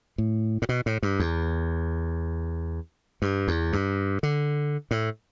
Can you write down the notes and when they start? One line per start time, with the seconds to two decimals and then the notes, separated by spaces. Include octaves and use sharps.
0.18 A2
0.62 A2
0.69 B2
0.86 A2
1.03 G2
1.20 E2
3.22 G2
3.48 E2
3.73 G2
4.23 D3
4.91 A2